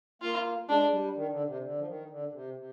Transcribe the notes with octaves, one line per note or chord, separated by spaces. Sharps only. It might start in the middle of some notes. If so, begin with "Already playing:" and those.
A#3 F4
G#3 D4
G3
D#3
D3
C3
D3
F3
D#3
D3
D3
C3
C3